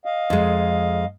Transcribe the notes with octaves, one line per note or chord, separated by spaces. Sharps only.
D#5 F5
F2 G#3